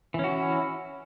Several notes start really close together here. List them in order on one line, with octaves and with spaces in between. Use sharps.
E3 C#4 F#4 E4